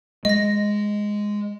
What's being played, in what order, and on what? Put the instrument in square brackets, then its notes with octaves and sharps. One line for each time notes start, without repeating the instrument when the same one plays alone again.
[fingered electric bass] G#3 [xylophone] D#5 A#6